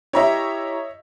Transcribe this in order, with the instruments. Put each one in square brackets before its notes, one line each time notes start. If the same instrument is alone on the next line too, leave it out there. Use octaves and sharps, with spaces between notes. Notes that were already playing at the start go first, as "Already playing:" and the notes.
[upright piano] E4 G4 A#5 [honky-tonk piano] C#5 D#5 E5